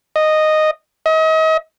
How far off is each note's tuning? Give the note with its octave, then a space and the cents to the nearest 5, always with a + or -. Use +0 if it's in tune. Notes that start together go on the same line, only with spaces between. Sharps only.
D#5 -10
D#5 +35